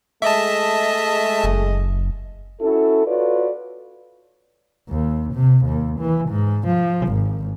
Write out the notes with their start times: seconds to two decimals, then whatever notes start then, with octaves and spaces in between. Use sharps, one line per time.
0.22 G#3 A3 D#5 E5 A5
1.44 F#1
2.61 C#4 E4 F#4 A4
3.07 F4 F#4 A4 B4 C#5 D5
4.89 D#2
5.34 C3
5.65 D#2
6.00 E3
6.29 G#2
6.67 F3
7.08 G#1